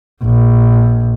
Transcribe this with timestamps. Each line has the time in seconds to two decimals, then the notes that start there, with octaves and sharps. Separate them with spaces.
0.24 A#1